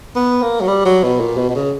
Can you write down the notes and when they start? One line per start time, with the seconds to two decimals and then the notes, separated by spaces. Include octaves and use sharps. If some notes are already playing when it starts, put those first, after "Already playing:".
0.16 B3
0.42 A#3
0.61 F#3
0.67 G3
0.85 F#3
1.03 B2
1.20 A#2
1.37 B2
1.49 B2
1.55 C#3